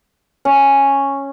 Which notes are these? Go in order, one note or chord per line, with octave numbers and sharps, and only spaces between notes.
C#4